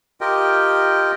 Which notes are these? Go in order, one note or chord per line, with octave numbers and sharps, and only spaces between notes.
F4 G4 A#4 D#5 G5